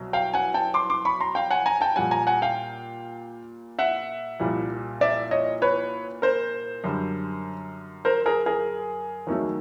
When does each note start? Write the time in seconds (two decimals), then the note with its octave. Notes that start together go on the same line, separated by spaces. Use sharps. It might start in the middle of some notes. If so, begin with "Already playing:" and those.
Already playing: C2 B2 F#3
0.13 F5 G5
0.34 F#5 G#5
0.54 G5 A5
0.74 C6 D6
0.90 C6 D6
1.05 B5 C#6
1.20 A#5 C6
1.35 F5 G5
1.51 F#5 G#5
1.66 G#5 A#5
1.81 G5 A5
1.96 A#2 G3 F#5 G#5
2.11 G#5 A#5
2.27 F#5 G#5
2.42 F5 G5
3.79 E5 F#5
4.40 C2 A#2 G3
5.01 D5 E5
5.31 C#5 D#5
5.62 B4 C#5
6.22 A#4 C5
6.84 F#2 D3 G3
8.05 A#4 C5
8.26 G#4 A#4
8.46 G#4 A#4
9.27 D#2 D#3 F#3 A3